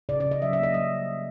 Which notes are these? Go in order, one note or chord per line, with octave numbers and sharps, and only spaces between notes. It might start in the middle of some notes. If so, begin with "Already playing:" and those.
C#3 D5
D5
C#3
D#5
F#3 E5
E5
A#3 D#5
G3 D#5